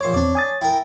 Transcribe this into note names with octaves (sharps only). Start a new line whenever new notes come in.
A#1 C5 C#5 D6
E2 C4 D4 D5
G#5 D#6 A6
E4 A#4 G5